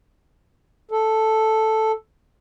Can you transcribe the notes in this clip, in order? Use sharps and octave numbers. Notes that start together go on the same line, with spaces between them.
A4